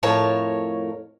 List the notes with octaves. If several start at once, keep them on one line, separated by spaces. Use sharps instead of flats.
F2 A2 A#4 C#5 A5